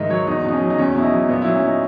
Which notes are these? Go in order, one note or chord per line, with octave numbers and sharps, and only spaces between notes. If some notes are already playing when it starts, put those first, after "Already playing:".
Already playing: G#2 D#3 D#5 E5
F#3 C#5
E2 D#4
B2 D#4
C#4
F#3
D#4
E2 C#4
B2 E4
D#4
F#3
A#2 B3
F#3 E4
C#4
A#2 D#4